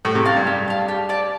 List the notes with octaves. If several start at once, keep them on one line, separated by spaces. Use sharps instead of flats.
A2 G4
C3
F5 A5
G2
G4
F5 A5
G4
D5 A5